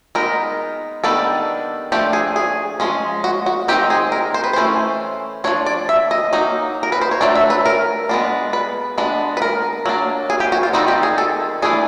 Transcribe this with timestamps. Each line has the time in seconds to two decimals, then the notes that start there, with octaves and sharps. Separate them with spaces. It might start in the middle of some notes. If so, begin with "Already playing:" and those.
0.15 G#3 B3 D#4 A#4
1.04 D#3 G3 B3 D4 A4
1.92 F3 A3 D4 G4
2.13 G#4
2.36 G#4
2.80 F3 G#3 C#4
3.24 F#4
3.46 F#4
3.68 D#3 G#3 C4 D#4 G4
3.90 G#4
4.12 A#4
4.34 C5
4.44 B4
4.53 E3 A3 C#4 C5
5.44 F3 A#3 D4 C#5
5.66 D5
5.89 E5
6.11 D#5
6.33 F#3 A#3 D#4
6.83 A#4
6.92 B4
7.01 C5
7.11 C#5
7.21 F#3 A3 D4 D5
7.35 E5
7.50 B4
7.65 A#4
8.09 G#3 B3 D4
8.53 B4
8.98 G#3 B3 D4
9.37 B4
9.42 A#4
9.86 F#3 A#3 D4
10.30 G#4
10.40 G4
10.52 F#4
10.63 F4
10.73 D#3 G3 C4 D#4 F#4
10.88 G4
11.03 G#4
11.18 A4
11.62 E3 A3 D4 G#4